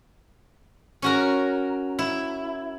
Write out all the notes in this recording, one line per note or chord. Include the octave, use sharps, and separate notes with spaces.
C#4 F#4 A#4
E4